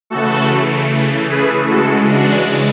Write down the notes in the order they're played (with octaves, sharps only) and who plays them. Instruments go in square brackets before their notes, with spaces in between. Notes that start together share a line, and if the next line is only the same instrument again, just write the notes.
[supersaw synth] C#3 E3 A3 F#4 A4
G#4 B4
C#3 E3 G#3 F#4 A4
D4 F#4